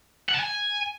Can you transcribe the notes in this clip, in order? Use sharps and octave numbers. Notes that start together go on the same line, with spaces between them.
F#5
A5
G#5